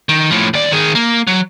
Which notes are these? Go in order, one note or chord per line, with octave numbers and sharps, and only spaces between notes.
D#3
A2 F3
D#2 D5
D#3 G#4
A#3
F#3